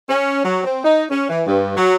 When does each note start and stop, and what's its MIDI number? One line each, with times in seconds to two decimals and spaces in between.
0.09 0.39 61
0.44 0.63 54
0.64 0.83 60
0.85 1.05 63
1.10 1.27 61
1.29 1.42 52
1.47 1.75 43
1.77 1.95 54